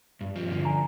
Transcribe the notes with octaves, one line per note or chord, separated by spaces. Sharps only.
G2
F3
D3
G#5 A#5